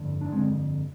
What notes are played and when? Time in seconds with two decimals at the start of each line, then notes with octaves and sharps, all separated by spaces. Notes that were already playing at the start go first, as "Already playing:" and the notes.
Already playing: G1 F2 D3
0.21 D4
0.32 G1 F2 D3 G#3 C4